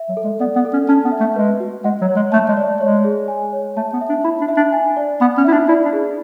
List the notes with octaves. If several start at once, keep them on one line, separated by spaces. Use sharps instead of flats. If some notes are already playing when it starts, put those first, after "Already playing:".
Already playing: E5
F#3
A4
G#3
B3 D5
B3
A4
C#4
C#4 A5
B3
E5
A3
G#3 B4
F#4
G#3 F#5
F#3
C#5
G#3
A3 A5
G#3
D5
G#3 C#5
G#4
G#5
C#5
A3 A5
B3
E5
D4
E4 B5
D4
E5
D4
G#5
D5
B3 B5
C#4
E4 E5
D4
E4 D5
D4
G#4